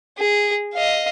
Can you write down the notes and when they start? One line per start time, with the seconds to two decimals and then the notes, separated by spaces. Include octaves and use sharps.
0.18 G#4
0.74 D#5 F5